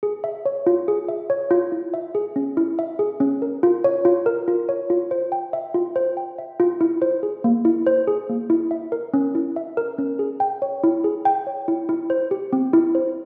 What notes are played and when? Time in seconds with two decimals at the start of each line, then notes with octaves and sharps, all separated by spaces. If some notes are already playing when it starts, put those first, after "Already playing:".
0.03 G#4
0.24 E5
0.46 C#5
0.67 F4
0.88 G#4
1.09 E5
1.30 C#5
1.51 F4
1.72 E4
1.94 E5
2.15 G#4
2.36 C#4
2.57 E4
2.79 E5
2.99 G#4
3.20 C#4
3.42 A#4
3.63 F4
3.84 C#5
4.05 F4
4.26 A#4
4.48 F4
4.69 C#5
4.90 F4
5.11 C5
5.32 G5
5.53 E5
5.74 F4
5.96 C5
6.17 G5
6.38 E5
6.60 F4
6.81 E4
7.02 C5
7.23 G#4
7.44 A#3
7.65 E4
7.87 C5
8.07 G#4
8.29 A#3
8.50 E4
8.71 E5
8.92 A#4
9.14 C#4
9.35 E4
9.56 E5
9.77 A#4
9.98 C#4
10.19 G#4
10.40 G5
10.62 C#5
10.84 E4
11.04 G#4
11.25 G5
11.47 C#5
11.68 E4
11.89 E4
12.10 C5
12.31 G4
12.53 C4
12.73 E4
12.95 C5